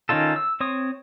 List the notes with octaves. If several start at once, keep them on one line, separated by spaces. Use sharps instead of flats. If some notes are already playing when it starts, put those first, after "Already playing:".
D#3 C#4 D#4 F4 A4
E6
C4 C#5 D#6